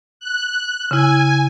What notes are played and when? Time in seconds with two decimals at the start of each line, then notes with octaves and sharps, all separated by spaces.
0.20 F#6
0.91 C#3 E4 G#5